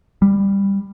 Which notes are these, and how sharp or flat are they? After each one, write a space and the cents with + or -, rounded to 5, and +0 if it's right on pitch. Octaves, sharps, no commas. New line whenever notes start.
G3 +15